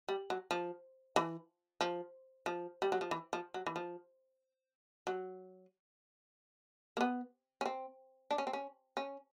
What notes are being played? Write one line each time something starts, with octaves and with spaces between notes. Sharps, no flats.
G3
F#3
F3
E3
F3
F3
G3
F#3
F3
E3
F3
F#3
E3
F3
F#3
A#3
B3
C#4
C4
D4
C#4
C4
C#4
C#4